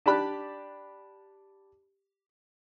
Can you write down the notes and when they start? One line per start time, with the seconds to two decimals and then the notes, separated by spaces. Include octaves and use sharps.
0.06 D4 G4 D5 B5 F#6